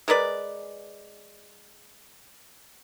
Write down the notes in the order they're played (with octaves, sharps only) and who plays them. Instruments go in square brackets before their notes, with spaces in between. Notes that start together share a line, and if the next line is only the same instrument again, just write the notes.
[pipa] G#3 A#4 B4 D5